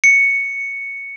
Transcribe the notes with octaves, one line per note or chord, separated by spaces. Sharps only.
C#7